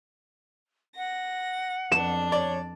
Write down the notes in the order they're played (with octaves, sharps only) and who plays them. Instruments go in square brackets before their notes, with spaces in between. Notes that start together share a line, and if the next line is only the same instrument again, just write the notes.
[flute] F#5 [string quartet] A#6
[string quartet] F2 D4 [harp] E7
[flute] C#5 [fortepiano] D5